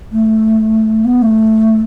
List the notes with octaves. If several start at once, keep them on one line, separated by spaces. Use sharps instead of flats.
A3
B3
A3